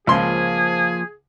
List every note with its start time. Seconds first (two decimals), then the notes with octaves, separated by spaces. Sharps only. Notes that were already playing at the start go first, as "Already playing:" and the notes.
0.07 C#2 F3 A#3 G#4 C5 F5 A5 C6